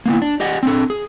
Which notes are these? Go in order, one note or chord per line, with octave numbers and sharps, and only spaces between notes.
A#3 B3 E4
D4
G4 D5 D#5 F#5
C4 D4 A4
G#4